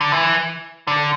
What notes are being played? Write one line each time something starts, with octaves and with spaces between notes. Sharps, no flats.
D3
E3
D3